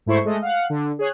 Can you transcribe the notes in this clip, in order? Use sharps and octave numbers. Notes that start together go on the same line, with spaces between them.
G#2 A3 E4 C5 C#6 C7
G#3 A3 D#5
F5 F#5
D3
G#4 C#5 F#6